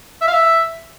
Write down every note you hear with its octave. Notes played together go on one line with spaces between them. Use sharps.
E5
F5
E5